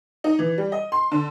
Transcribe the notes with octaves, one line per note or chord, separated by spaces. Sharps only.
D#4
E3
G3
D#5
C6
D3